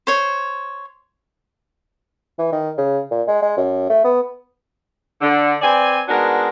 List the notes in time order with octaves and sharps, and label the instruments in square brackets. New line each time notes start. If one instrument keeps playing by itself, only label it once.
[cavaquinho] C5 C#5
[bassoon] E3
D#3
C#3
A#2
G#3
G#3
F#2
A3
B3
[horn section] D3
C4 B4 D5 G#5
G#3 B3 D4 D#4 F#4 A#4